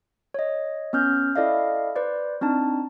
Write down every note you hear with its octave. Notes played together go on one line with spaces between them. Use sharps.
C#5 D#5
B3 C#4 F6 G6
E4 A4 D5 D#5 F5
B4 C5 D5
C4 D4 D#4 A5